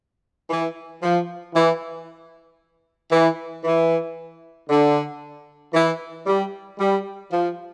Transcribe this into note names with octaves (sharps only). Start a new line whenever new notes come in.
E3
F3
E3
E3
E3
D3
E3
G3
G3
F3